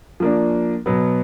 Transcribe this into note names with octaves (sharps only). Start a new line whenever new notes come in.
F3 A#3 D4
B2 F#3 B3